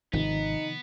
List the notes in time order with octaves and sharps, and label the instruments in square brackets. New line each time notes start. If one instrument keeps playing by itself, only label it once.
[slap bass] G#1 [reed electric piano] C3 D#3 F3 [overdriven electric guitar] B3 [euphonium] D#4